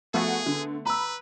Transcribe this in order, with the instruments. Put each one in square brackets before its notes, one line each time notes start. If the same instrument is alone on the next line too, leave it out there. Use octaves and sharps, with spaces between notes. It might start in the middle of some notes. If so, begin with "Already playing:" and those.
[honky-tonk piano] F3 F#4 [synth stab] A3 B3 [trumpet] G#4
[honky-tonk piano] D3
[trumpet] B4 [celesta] A#5 E6 [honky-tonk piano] B5